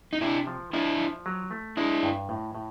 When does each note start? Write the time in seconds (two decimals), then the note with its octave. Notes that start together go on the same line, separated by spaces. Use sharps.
0.13 D#4
0.21 C3 D4 E4
0.47 F3
0.73 F3 D4 E4
0.99 F3
1.26 F#3
1.51 A3
1.77 G#3 D4 E4
2.03 G2
2.29 A2
2.55 A2